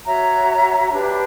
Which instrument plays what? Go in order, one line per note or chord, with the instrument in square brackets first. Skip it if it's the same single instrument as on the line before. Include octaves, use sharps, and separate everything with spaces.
[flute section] F#4 C#5 E5 A#5
D4 G4 B4